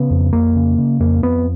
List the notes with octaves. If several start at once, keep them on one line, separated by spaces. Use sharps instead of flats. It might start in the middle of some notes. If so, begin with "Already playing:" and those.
Already playing: C#3 B3
F2
F2 A#3
C#3
C#3
F2 A#3
F2 B3